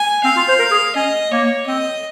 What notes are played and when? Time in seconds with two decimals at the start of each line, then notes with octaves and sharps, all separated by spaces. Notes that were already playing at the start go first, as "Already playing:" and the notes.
Already playing: G#5
0.24 C4 F5
0.36 F4
0.48 C5
0.59 A#4
0.71 G#4
0.96 C#4 D#5
1.31 A#3 C#5
1.67 C4 D#5